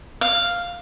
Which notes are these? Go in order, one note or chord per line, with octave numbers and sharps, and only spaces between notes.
F5